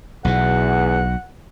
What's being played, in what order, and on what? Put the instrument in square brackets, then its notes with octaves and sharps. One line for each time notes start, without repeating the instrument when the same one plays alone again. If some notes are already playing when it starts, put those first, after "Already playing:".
[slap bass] B1 B2 [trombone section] E2 [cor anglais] F#5